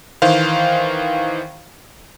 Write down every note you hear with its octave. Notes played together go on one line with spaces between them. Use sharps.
D#3 E3 C5 F5